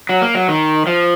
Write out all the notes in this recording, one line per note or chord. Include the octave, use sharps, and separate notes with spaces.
F#3
A#3
F#3
D#3
F3